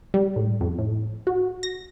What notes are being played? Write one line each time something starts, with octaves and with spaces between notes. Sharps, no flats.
G3
A2
F2
A2
F#4
A#6